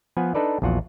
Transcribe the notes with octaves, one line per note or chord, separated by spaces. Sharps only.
F3 B3 B4 F#5 G#5
D4 D#4 A4 B4 D5
A#1 E2 F4 F#4 F#5